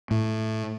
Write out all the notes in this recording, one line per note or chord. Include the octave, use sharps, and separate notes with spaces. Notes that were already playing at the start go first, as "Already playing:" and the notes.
A2